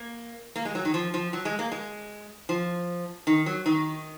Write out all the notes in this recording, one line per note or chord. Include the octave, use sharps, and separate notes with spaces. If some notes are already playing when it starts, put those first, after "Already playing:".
Already playing: A#3
A#3
G#3
F#3
D#3
F3
F3
F#3
G#3
A#3
G#3
F3
D#3
F#3
D#3